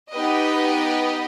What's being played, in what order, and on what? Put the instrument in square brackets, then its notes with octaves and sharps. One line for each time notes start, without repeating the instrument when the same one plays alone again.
[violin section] B3 D#4 G4 B4 D#5